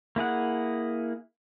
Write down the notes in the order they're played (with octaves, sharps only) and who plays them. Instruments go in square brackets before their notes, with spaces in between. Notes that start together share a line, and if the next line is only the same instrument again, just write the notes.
[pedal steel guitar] A#3 E4 G#4 F#5